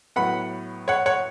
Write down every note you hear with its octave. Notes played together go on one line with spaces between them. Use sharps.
A2 F#3 B3 F#5 B5
C#5 F#5
C#5 F#5